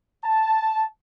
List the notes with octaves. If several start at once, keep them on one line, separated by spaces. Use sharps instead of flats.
A5